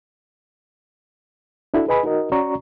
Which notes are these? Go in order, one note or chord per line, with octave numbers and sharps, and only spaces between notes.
D4 E4 F#4 A4
G#4 B4 D#5 G#5 B5
D#4 F#4 A#4 D#5
C#4 F#4 D5 A#5 C#6